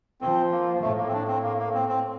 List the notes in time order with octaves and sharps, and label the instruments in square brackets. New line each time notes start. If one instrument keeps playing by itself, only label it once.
[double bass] F3 [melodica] C4
[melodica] A#3
[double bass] A2 [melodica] A3
[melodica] A#3
C4
D4
C4
A#3
A#3
C4
C4